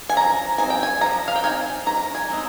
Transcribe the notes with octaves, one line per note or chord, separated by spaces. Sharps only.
G#5
F3 A#5
C4 D#4 G#5
G5
G#5
F3 A#5
F5
G5
C4 D#4 G#5
D#3 A#5
G#5
G#3 C4 D#4